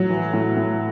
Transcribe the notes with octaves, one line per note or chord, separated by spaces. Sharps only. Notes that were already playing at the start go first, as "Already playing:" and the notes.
Already playing: A2 F#3
E3
A2
A2